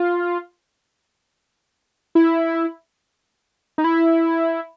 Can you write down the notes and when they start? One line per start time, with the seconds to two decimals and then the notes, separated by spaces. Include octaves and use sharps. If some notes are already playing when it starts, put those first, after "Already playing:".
Already playing: F4
2.15 E4
3.78 D#4
3.84 E4